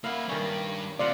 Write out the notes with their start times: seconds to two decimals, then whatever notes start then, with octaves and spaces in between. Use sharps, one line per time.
0.04 A#3 E4 F5 F#5
0.29 G2 D#3 G3 C#4
0.99 C3 A#3 F4 D5 F5 F#5